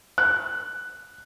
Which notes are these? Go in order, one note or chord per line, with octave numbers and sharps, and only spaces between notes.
F#6